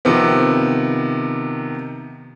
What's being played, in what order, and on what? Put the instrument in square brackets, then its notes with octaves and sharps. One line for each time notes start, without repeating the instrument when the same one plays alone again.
[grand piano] C3 D#3 F3 B3